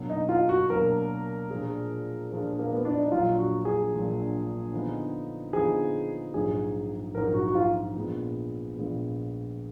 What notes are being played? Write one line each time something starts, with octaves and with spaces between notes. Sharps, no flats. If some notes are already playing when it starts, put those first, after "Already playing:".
Already playing: B2 F#3 A#3 D4
D#4
F4
F#4
B2 F#3 A#3 D4 A#4
A#2 F3 G#3 D4 G#4
A#2 F3 G#3 D4 G#4
A#3
B3
D4
D#4
A#1 A#2 F#3 D4 F4
F#4
G#4
A#1 A#2 F#3 D4
D3 F3 B3 D#4
D3 F3 B3 D#4 G#4
A#1 G#2 F#3 G#4
A#1 G#2 F#3 A#4
F#4
F#4
F4
A#1 A#2 G#3 B3
A#1 A#2 G#3 B3